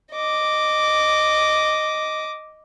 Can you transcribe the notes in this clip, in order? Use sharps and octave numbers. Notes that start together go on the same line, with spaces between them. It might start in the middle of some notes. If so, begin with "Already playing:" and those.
D#5 D6